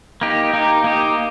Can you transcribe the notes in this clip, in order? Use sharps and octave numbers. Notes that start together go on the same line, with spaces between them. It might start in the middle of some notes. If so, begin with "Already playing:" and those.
A#3 D#4 G4
A#3 D#4 G4
A#3 D#4 G4